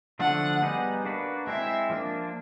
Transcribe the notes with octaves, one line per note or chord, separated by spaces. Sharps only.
D3 F3 A3 D4 F#5
G3 B3 D#4 G#4 B4
A#3 D4 F#4 B4
G#3 C4 E4 E5
F3 A#3 D4